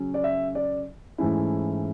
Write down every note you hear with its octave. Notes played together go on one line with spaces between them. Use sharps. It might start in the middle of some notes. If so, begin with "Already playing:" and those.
Already playing: C#3 F#3 C#4
D5
E5
D5
G#2 E3 A3 C#4 E4